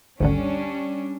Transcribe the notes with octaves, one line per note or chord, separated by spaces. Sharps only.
G#1 D2 D3 G3 C#4 D4